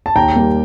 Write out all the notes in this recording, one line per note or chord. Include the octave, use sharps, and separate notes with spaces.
A5
D#2 G5 A#5
D#3 G3 A#3